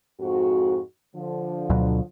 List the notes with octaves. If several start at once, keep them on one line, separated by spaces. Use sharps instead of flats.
F2 G#2 F#4
D3 F3
D2 B2 F#3